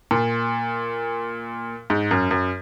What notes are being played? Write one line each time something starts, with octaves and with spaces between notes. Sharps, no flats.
A#2
G#2
F#2
F#2